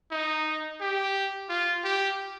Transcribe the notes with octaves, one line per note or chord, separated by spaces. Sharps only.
D#4
G4
F4
G4